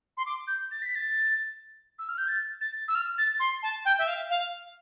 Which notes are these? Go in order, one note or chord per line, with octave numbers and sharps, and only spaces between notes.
C6
D6
G6
A6
B6
A6
E6
F6
G6
A6
A6
E6
F6
A6
C6
A5
G5
E5
F5
F5